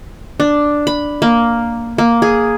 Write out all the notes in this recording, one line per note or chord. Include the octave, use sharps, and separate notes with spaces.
D4
B5
A#3
A#3
G#4